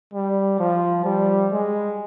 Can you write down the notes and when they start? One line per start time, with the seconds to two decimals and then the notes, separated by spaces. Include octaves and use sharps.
0.14 G3
0.59 F3
1.05 G3
1.52 G#3